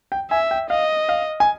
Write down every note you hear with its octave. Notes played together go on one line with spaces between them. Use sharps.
G5
E5 G#5
G5
D#5 F5
F5
G#5